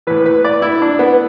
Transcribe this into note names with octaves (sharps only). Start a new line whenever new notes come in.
A2 E3 B4
B4
D5
E4
D4
B3